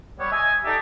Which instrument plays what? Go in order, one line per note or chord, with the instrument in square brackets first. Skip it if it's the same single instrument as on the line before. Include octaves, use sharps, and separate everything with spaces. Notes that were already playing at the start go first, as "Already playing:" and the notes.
[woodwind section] G3 B3 C#5
D#5 E5 G#5
D#4 G4 A4 D5 E5